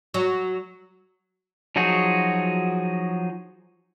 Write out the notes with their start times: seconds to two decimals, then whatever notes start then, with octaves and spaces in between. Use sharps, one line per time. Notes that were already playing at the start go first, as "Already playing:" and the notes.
0.14 F#3
1.76 F3 F#3 D#4 F#4 G#4